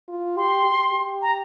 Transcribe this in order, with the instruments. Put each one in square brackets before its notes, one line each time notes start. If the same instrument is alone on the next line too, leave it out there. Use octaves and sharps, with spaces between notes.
[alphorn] F4
[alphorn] G4 [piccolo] C6
[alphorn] G4
G4
[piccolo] A#5